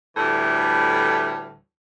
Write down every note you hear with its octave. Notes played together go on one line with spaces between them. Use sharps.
D2 A2 E3 G3